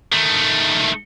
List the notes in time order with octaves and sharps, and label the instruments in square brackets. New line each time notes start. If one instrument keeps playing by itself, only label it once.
[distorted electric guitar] D#3 A3